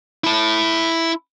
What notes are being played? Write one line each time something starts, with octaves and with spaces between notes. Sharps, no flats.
E4 A5